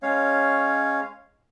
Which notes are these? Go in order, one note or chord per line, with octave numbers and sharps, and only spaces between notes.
G#3 C#4 C#5 F5